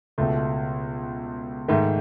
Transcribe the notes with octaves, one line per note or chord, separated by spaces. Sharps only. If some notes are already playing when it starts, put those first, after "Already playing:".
C#2 B2 A3
G#2 D#3 A3